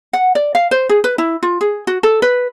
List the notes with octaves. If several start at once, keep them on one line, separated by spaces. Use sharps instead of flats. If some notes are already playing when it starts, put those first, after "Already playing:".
F#5
D5
F5
C5
G#4
B4
E4
F4
G#4
F#4
A4
B4